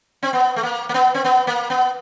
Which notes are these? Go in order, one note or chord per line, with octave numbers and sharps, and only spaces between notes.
C4
B3
A3
A#3
A#3
B3
C4
B3
A#3
B3